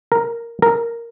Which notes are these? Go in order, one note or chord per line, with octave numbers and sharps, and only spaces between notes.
A#4
A#4